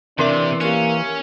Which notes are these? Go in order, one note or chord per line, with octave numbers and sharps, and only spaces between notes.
C3 E3 C4 D4 A#4 E5 C6 D6
A#3 C#4 G4 F#6